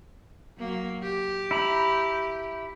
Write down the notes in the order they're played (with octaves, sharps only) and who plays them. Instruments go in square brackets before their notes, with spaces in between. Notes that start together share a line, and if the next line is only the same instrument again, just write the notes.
[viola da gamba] F#3 A#3
G4
[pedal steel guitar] E4 A#5 B5